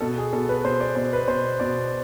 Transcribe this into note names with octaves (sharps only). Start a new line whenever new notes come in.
B2 A4
G#4
B2 A4
B4
B2 C5
D5
B2 C5
B4
B2 C5
B2 D5